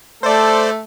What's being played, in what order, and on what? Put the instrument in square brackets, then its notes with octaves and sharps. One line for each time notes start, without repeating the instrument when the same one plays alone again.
[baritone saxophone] A3 [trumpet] A4 [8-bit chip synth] C5 D5